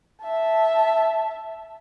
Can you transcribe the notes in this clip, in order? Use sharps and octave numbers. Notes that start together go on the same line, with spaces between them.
E5 A5